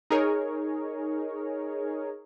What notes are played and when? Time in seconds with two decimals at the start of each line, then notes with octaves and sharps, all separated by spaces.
0.10 D#4 G#4 A#4 C#5